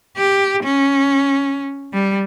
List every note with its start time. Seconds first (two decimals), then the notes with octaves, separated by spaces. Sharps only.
0.17 G4
0.63 C#4
1.93 G3